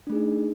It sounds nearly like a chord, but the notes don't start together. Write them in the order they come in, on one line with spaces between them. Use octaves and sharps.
D4 A3 G#4 D#4